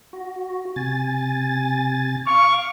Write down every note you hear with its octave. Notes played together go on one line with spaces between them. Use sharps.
F#4
C3 G#5 A6
F5 C#6 D6 F6